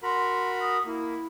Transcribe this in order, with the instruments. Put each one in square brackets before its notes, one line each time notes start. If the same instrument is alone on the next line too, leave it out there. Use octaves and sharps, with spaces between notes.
[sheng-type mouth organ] F#4 A#4 B5 [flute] C6
[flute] D#6
[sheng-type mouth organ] A#3 [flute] E4